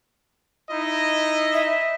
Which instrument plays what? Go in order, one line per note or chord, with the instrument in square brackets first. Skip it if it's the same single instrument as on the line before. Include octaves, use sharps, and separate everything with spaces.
[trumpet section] D#4 E4 D#5
[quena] E5